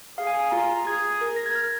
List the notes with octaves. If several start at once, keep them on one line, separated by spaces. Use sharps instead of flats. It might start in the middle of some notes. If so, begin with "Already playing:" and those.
G#4 F5
G#5
F5
F4 A#5
A#5
G#4 G#6
A#4
A#6
G#6
F6